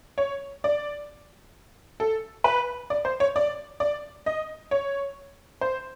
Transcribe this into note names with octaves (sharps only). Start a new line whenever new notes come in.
C#5
D5
A4
B4
D5
C5
C#5
D5
D5
D#5
C#5
C5